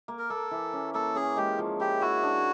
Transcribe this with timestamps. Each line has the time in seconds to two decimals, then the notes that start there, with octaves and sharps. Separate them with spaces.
0.08 A#3
0.19 A#4
0.30 A#3 A4
0.51 E3
0.73 C#4
0.94 A#3 A4
1.15 C#4 G#4
1.36 G#3 G4
1.59 F3
1.80 E4 G4
2.01 E4 F#4
2.23 D4